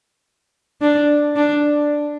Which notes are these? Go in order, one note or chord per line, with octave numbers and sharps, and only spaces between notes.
D4
D4